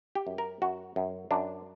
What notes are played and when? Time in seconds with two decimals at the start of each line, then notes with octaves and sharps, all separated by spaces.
0.15 G4
0.27 F#2
0.38 A#4
0.62 F#2 F#4
0.96 F#2
1.31 F#2 D4